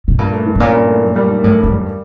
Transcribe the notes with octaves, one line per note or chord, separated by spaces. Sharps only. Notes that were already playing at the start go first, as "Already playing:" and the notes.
B2
G2 A#2
A3
E3
A2
A#2 C#4
G2
A3
F#2
G3
D#3
F#2 A2
F#2
F2
G3